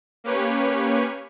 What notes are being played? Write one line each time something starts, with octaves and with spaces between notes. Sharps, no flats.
A#3 C#4 G4 B4 C#5